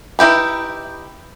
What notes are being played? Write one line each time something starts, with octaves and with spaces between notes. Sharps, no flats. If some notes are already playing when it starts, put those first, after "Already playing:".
D#4 E4 G4 B4